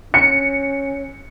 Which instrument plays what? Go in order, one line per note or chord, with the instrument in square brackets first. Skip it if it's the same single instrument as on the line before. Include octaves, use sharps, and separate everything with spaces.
[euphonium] C#4 [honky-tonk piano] C#7